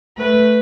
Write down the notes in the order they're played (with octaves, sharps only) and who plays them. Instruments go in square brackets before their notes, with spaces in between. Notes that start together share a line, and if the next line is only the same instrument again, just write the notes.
[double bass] A3 [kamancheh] B4